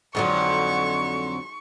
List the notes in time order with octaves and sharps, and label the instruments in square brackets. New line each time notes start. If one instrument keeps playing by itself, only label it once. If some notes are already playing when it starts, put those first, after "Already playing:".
[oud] F2 D3 F#3 [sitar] G#2 [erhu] C#6